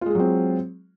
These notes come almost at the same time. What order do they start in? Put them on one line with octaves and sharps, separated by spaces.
F4 G#3 G#4 F#3 C4